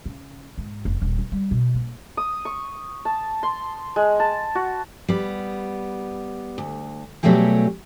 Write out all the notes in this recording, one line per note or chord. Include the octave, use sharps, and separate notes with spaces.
C#3
G#2
F1
D#1
F#3
G3
B2
A#3
D#6
C#6
A5
C6
G#3
A5
F#4
G3 B3
D2
B2 F#3 G3 A3 G4 G#4